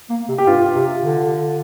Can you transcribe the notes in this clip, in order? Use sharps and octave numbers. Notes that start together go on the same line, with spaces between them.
A#3
C3
G4
G2 F4
C3
D3